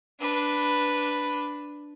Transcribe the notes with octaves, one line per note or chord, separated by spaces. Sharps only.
D4 B4